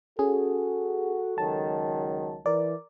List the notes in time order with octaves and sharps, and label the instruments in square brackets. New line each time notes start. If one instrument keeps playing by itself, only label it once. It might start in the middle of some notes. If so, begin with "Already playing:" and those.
[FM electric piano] C#4 G#4 [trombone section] F#4 [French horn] A4
[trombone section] C#2 D#3 F#3 [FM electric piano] A5
[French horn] E3 [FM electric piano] A#4 D5